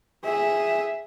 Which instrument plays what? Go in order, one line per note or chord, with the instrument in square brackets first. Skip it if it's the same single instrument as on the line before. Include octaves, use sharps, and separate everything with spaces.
[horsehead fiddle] G#4 E5